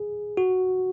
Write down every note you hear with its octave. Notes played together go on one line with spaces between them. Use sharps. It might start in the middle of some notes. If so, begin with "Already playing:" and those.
Already playing: G#4
F#4